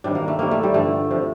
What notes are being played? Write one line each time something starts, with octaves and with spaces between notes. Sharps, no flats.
C3 D#3 G3 D4
A#3
A3
C3 D#3 G3 A#3
A3
G3
G2 D3 F3 A3
C3 F3